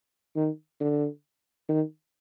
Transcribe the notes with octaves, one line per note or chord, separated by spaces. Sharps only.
D#3
D3
D#3